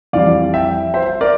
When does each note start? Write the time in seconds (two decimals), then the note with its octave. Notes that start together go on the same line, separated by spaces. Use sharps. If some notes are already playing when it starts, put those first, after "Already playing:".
0.13 F2 E3 G3 D5 F5
0.54 E5 G5
0.94 C5 E5
1.21 A#4 D5